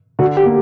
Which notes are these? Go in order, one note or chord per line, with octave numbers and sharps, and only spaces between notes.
D3 F#4
G4
A#3